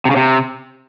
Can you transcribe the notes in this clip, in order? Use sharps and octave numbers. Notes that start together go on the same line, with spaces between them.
C3
C#3
C3